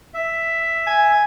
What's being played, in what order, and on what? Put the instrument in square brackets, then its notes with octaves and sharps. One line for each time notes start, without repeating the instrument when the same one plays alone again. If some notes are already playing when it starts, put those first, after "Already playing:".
[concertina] E5
[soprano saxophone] G#5